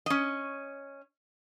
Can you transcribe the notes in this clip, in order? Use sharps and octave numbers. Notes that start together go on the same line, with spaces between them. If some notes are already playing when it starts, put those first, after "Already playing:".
C#4 D#5